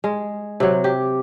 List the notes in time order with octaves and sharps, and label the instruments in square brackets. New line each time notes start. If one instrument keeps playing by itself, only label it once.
[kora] G#3
C3 F#3
G4